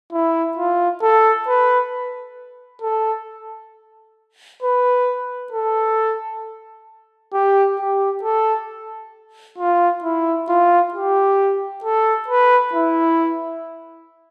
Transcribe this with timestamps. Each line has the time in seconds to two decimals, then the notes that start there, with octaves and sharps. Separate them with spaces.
0.13 E4
0.57 F4
1.02 A4
1.48 B4
2.82 A4
4.63 B4
5.53 A4
7.33 G4
7.79 G4
8.24 A4
9.59 F4
10.04 E4
10.49 F4
10.94 G4
11.84 A4
12.28 B4
12.74 E4